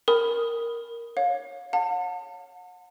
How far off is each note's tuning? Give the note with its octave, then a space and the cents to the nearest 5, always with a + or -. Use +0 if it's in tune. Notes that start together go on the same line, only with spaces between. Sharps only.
A#4 +0 B5 +0 D#6 +0
C#5 +0 F5 +30
F#5 -40 A5 +35